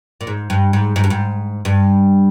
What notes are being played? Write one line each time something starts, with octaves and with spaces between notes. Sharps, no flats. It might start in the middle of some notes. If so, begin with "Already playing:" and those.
A#2
G#2
G2
G#2
G#2
G2
G#2
G2